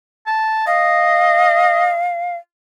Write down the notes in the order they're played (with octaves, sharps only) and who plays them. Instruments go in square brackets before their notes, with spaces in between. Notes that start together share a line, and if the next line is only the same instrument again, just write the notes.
[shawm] A5
[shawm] D#5 [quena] F5